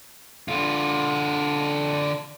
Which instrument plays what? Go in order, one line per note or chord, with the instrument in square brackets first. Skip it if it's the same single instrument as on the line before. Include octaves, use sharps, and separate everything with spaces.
[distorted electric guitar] D3 F4